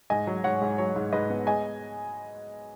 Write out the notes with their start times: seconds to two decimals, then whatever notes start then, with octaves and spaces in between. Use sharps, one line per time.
0.10 G#2 D#5 G#5
0.27 F#3
0.44 G#2 C#5 F#5
0.61 G#2
0.78 F#3 C#5
0.96 G#2
1.13 G#2 B4 D#5
1.30 B3
1.47 G#3 D#5 G#5